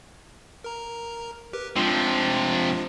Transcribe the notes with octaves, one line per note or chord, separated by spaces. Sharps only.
A#4 A#5
G4 A#4 B4
C3 F3 G#3 D4 F4